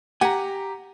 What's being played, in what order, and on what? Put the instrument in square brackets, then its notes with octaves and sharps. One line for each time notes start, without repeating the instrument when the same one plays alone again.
[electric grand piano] G4 A#5 [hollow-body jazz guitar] F#5 G#5